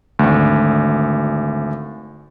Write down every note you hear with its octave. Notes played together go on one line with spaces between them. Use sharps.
G#1 D2